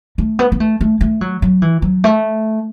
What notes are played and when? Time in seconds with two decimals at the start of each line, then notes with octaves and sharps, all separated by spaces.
0.18 A3
0.39 B3
0.52 B3
0.60 A3
0.81 A3
1.01 A3
1.21 F#3
1.42 F#3
1.62 E3
1.82 F#3
2.04 A3